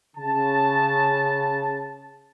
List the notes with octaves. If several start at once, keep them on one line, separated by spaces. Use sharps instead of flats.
C#3 A5